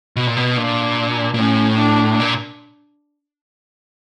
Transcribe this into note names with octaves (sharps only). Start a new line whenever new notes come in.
B2
A#2
B2
A#2 D4
A#2
A2 C#4
D4
A#2